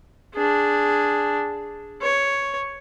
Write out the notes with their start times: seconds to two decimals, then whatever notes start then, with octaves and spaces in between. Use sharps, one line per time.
0.34 D4 G#4
2.01 C#5